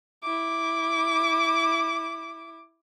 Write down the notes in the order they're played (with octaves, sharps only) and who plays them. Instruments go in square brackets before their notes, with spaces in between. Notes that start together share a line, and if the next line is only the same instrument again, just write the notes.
[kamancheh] E4 D6